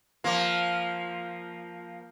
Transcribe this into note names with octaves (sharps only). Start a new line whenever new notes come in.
F3 A#3